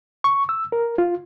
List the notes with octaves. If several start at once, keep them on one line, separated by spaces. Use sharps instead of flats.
C#6
E6
A#4
F4